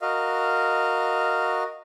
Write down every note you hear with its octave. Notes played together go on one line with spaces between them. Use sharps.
F#4 A#4 D#5 F5